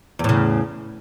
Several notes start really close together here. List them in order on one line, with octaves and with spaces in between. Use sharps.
E2 A2 C#3